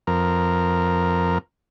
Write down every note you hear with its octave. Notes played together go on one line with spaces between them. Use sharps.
F2 A#4